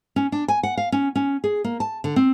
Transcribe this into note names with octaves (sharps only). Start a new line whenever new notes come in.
C#4
D4
G#5
F#5
F5
C#4
C#4
G#4
A#3
A5
D3
C4